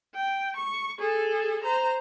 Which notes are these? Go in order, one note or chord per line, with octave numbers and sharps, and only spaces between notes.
G5
C#6
G#4 A4
C5 A#5